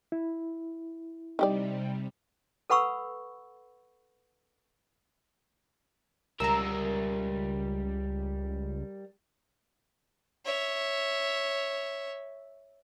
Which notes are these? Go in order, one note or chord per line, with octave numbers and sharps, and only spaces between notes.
E4
C3 G3 D#4 G4 D5
A4 B4 F#5 B5 C#6 E6
C#2 G3 A#4 A#5 E6
C#5 E5